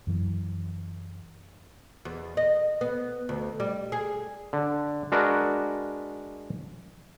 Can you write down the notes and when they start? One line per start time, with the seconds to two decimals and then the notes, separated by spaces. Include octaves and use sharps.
0.07 F#2 E3
2.05 E2
2.37 D#5
2.81 B3
3.29 D2
3.60 G3
3.92 G#4
4.53 D3
5.12 G#3 D4 F#4 A#4 B4